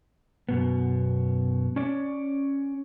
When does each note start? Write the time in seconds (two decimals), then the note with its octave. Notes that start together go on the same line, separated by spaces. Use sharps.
0.49 F#2 B2 B3
1.76 C#4 C#5 D5